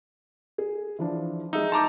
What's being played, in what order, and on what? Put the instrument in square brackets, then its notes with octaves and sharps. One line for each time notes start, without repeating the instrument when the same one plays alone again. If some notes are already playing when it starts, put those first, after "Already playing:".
[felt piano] G#4
E3 F3 D4
[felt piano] G#3 E5 E6 [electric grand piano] D#4
[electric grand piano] A5 A#5 D6 [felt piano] C6 G6